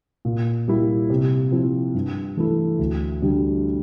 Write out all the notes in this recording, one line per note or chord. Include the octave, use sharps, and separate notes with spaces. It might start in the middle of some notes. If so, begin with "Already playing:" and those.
A#2
G3 A#3 E4
C3
F3 C4 E4
G2
E3 A3 E4
D2
D3 G3